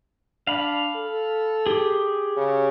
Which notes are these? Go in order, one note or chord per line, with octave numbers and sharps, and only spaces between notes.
D4 F5 B5
A4
G4 G#4
C#3